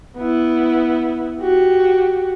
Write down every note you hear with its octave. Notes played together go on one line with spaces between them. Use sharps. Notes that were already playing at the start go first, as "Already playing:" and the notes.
B3 E4
F#4 G4